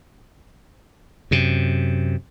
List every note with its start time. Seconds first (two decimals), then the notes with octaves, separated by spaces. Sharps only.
1.31 F#2 C3